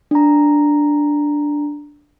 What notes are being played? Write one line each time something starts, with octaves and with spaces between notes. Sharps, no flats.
D4 A#5